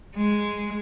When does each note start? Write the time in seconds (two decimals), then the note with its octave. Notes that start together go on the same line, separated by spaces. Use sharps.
0.16 G#3